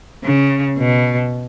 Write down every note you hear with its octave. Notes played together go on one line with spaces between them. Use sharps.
C#3
B2